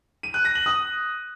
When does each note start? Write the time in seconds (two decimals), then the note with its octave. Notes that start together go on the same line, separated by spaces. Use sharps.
0.23 D#7
0.34 F#6
0.45 A#6
0.55 F#7
0.66 D#6